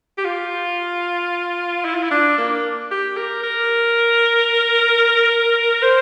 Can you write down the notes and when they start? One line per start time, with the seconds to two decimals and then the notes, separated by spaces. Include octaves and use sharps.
0.18 G4
0.25 F4
1.85 E4
1.95 F4
2.03 E4
2.11 D4
2.38 A#3
2.91 G4
3.17 A#4
3.44 A#4
5.82 C5